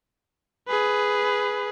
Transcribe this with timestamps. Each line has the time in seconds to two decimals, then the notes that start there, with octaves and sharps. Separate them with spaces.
0.68 G#4 B4